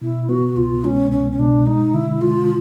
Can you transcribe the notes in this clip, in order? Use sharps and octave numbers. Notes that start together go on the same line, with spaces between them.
B2 E4
B3 F#4
C2 F4
G#3 C#4
C2 C#4
C#4
B2 D4
G#3 D#4
D3 E4
G#3 F4